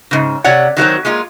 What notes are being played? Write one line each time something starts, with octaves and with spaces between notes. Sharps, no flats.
G#2 C#3
C3 C#5 D5 F#5
D#3 F#3 A#3 C4
G#3 A#3 F4